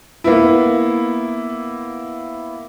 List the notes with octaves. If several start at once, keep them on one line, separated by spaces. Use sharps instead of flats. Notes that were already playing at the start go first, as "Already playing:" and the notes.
A#3 B3 E4